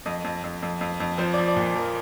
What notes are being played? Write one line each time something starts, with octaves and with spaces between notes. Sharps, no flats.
F2 D#5
F2
F2
F2
F2
F2
F3 C5
D5
F3
D5
A#2
F3 A#4